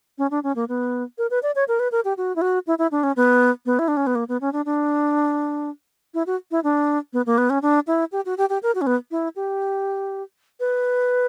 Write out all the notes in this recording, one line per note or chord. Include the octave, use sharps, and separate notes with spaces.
C#4
D4
C#4
A#3
B3
A#4
B4
D5
C#5
A#4
B4
A#4
G4
F#4
E4
F#4
E4
E4
D4
C#4
B3
B3
E4
D4
C#4
B3
A#3
B3
C#4
D4
D4
E4
F#4
E4
D4
B3
A#3
B3
C#4
D4
E4
G4
F#4
G4
G4
A#4
F#4
C#4
B3
E4
G4
B4